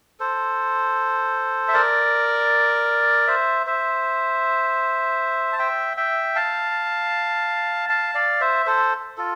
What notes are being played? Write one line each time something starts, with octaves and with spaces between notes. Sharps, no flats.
A4 C5
E5
A#4 D5
C5 E5
C5 E5
A5
E5 G5
E5 G5
F5 A5
F5 A5
D5 F5
C5 E5
A4 C5
F4 A4